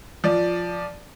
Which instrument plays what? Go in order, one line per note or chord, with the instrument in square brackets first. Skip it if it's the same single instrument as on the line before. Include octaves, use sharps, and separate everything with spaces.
[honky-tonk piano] F3 D5